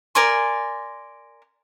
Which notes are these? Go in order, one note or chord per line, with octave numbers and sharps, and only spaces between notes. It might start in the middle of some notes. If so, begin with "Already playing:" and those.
A#4 D5 G#5 C6